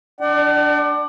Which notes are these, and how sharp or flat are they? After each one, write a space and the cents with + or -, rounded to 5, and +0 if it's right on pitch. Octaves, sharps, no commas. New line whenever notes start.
D4 +0 D5 +25 F#5 +45